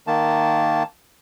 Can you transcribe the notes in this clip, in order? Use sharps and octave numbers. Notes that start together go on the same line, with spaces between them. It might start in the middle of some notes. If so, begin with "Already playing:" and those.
D#3 A#3 A5